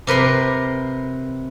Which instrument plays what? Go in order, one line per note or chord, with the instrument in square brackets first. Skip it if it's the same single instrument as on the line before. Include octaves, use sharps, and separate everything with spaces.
[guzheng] C3 A#4 B4 C6